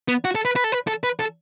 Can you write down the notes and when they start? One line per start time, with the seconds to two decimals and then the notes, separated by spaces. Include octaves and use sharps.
0.08 B3
0.25 F#4
0.35 A4
0.45 B4
0.56 B4
0.64 A4
0.72 B4
0.87 A4
1.04 B4
1.19 A4